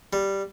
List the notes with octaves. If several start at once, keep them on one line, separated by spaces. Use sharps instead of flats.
G3